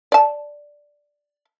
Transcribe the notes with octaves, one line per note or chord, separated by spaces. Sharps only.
D5 A5